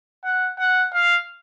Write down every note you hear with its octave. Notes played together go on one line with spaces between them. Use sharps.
F#5
F#5
F5